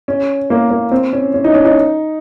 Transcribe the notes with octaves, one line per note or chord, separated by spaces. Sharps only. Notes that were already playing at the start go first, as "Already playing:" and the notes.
C#4
A#3
A#3
C4
C#4
C#4
D#4
C#4
D#4